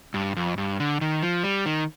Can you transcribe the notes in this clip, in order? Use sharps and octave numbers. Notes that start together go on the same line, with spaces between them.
G2
F2
G2
D3
D#3
F3
G3
D#3